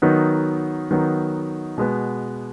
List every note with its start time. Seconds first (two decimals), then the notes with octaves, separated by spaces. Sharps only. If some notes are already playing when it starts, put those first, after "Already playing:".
0.02 D#3 F#3 B3 D#4
0.91 D#3 F#3 B3 D#4
1.78 B2 G#3 B3